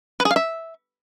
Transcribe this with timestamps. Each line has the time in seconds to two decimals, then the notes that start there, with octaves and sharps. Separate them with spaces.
0.20 B4
0.25 G#4
0.31 F5
0.36 E5